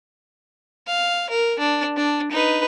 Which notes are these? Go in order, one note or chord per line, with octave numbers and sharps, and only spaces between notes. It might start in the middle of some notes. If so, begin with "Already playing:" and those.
F5
A#4
D4
D4
D#4 B4